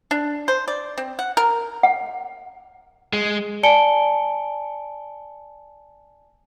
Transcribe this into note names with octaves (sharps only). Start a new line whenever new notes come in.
D4
C5
D5
C4
F#5
A#4
F#5
G#3
D5 G#5 A5 C#7 D7 G7